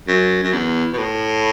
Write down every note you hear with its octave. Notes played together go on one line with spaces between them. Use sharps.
F#2
F#2
E2
B2
A2